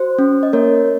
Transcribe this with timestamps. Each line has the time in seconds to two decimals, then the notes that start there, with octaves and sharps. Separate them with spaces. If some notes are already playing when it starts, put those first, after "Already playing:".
Already playing: F#4 C5
0.19 C#4
0.43 D#5
0.53 A#3 A#4 C#5